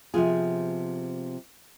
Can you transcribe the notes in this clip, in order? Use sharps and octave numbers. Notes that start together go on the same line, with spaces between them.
C3 F3 B3 F4 G#4